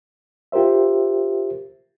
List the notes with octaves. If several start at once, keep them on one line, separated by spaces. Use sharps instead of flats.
F4 G4 A#4 C5 E5